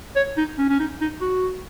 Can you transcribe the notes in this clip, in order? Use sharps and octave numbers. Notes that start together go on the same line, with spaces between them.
C#5
D#4
C#4
C#4
D#4
D#4
F#4